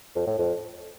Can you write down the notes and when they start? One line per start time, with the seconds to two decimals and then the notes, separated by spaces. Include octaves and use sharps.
0.15 F2
0.27 A2
0.38 F2